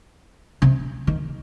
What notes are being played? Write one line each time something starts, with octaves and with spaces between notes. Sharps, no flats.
C3
D#3